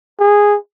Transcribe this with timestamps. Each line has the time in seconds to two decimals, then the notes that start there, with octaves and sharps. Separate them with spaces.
0.20 G#4